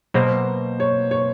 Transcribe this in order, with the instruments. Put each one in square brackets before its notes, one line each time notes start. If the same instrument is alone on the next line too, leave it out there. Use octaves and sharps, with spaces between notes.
[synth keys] B2 F#3 A#3 [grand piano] C5
[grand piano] C#5
C#5